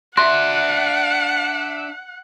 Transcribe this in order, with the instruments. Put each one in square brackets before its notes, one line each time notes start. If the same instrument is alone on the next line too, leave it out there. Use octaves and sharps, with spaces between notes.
[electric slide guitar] D4 E5 [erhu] F#5 [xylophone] C6 A#6 [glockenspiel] F#6